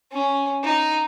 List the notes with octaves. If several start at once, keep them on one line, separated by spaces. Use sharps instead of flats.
C#4
D#4